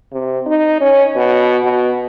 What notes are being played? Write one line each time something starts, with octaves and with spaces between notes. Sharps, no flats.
C3
D#4
C#4
B2
B2